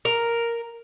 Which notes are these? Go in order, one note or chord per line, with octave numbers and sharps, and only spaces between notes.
A#4